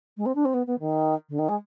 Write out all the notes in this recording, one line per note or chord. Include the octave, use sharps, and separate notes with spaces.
G#3
C4
D4
C4
B3
B3
D#3
D3
D#3
G#3